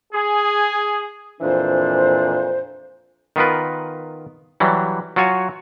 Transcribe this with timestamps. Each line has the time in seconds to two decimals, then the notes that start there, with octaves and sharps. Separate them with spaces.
0.13 G#4
1.41 F2 A#2 E3 D4 C5
3.36 D#3 B3 F4 A#4 B4
4.60 E3 F#3 G3
5.16 F#3 F4 F#4 C#5 G#5